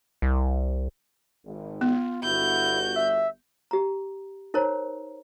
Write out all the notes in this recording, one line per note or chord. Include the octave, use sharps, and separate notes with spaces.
C2
G#1
B3 F4
G1 E4 F#4 G6
E5
G4 A#5
D#4 A#4 C5 C#5 A#5